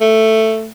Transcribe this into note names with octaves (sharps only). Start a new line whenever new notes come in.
A3